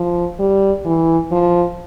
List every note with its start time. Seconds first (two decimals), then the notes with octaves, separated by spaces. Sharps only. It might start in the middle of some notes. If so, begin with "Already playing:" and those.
Already playing: F3
0.40 G3
0.86 E3
1.32 F3